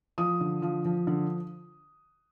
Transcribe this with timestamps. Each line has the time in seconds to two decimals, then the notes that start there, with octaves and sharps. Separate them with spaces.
0.18 F3 D#6
0.41 D3
0.62 F3
0.85 F3
1.07 D3